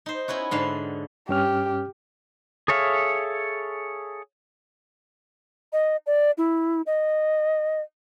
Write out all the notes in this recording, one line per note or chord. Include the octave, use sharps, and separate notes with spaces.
D#4 C5
B3 C#4 E4 F#4
G#2 D3 F5
G2 C#4 G4 F6
G#4 A4 C#5 E5 F5
D#5
D5
E4
D#5